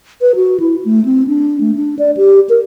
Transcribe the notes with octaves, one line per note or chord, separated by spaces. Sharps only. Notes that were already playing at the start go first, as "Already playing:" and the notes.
B4
F#4
E4
A3
C4
D4
A3
D4
D5
G4
A#4